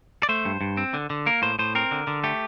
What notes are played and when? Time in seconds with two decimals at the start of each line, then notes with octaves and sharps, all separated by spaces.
0.23 D5
0.29 A3 C5
0.45 G2
0.61 G2
0.77 C4
0.94 D3
1.10 D3
1.26 A#3 A#4
1.42 A2 C5
1.59 A2 C5
1.75 C4 A#4
1.91 D3
2.07 D3
2.24 A3 G4